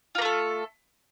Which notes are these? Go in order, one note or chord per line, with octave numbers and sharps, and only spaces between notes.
A3 A#3 F4 A4